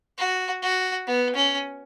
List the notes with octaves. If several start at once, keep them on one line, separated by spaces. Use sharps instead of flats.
F#4
F#4
B3
C#4